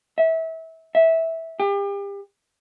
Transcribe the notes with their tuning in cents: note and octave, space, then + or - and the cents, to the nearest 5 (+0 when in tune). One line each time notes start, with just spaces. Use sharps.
E5 -25
E5 -15
G4 +35